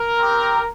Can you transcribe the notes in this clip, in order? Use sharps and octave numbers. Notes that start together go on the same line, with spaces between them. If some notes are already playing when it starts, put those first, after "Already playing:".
Already playing: A#4
C4 G4